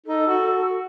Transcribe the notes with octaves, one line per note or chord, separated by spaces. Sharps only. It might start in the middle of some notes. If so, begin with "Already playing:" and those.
D#4 A4
F#4